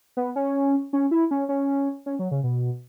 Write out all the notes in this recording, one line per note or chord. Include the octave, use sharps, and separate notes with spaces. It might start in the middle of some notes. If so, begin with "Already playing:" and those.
B3
C#4
C#4
E4
C#4
C#4
C#4
F#3
C#3
B2